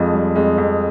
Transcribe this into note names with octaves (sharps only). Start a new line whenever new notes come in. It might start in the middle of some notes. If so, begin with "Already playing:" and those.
Already playing: F2 F3 G#3
G3
F2 G#3
F2